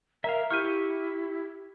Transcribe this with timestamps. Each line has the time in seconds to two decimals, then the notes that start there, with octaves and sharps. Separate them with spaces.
0.24 A#4 E5 F5 A#5
0.50 E4 G4 C#6 F6 G6 D#7